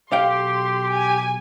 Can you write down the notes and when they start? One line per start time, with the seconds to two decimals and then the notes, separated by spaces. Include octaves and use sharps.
0.12 B1 G4 F5 G5 C6
0.90 G#5